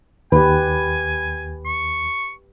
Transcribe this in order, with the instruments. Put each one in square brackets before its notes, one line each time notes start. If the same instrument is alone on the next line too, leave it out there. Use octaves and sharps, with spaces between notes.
[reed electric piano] D#2 [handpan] G4 B4 [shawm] G#5
[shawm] C#6